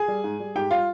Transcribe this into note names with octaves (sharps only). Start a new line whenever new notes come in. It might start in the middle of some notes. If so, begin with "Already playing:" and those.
Already playing: G#4 G#5
G3
G#2
G3
G#2 G4 G5
G3 F4 F5